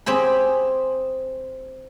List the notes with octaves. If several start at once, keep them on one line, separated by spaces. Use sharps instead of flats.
C4 G4 G#4 B5